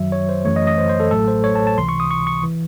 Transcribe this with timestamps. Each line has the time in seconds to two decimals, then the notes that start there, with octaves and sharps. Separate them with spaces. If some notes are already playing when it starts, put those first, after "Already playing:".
Already playing: F#2 D#3 F#3 E5
0.12 C#5
0.29 C5
0.45 F#2 E3 A3 C#5
0.56 D#5
0.67 D#5
0.78 C5
0.89 C5
1.00 A4
1.11 A1 A2 F#3 A3 A4
1.28 C5
1.44 C#5
1.56 A5
1.67 A5
1.77 C#2 C3 E3 C6
1.89 C#6
2.00 D#6
2.11 C#6
2.27 C#6
2.43 E3